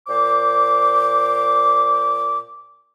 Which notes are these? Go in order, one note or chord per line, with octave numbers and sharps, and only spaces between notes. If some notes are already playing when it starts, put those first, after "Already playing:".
A#2 C5 D6